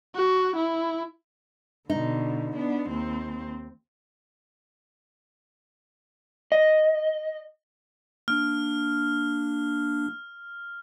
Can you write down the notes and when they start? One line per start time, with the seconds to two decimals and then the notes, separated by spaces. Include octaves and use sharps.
0.15 F#4
0.56 E4
1.90 B2 D3 D#4
2.56 B3 D4
2.89 D#2 C4
6.52 D#5
8.28 A#3 D4 F6